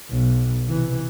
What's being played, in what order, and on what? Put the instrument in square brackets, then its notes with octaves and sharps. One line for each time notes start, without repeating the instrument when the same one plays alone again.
[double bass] B1
C3 E3